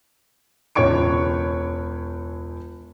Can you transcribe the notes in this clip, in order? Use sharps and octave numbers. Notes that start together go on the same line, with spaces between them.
E1 C#2 C#5 C#6 D7